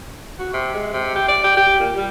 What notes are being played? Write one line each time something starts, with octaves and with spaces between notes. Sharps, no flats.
F#4
C3
G#3
C3
G4
D5
G4
G4
A#2
G3